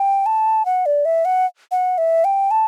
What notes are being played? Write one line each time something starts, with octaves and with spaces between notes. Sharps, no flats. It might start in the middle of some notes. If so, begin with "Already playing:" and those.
Already playing: G5
A5
F#5
D5
E5
F#5
F#5
E5
G5
A5